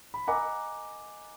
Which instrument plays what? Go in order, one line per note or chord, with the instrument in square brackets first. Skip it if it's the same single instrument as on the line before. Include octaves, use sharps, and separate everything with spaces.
[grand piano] B5
[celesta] A#4 D#5 G#5 D6 [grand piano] F#5 A#5